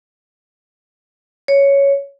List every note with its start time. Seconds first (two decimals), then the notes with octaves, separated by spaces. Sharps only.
1.48 C#5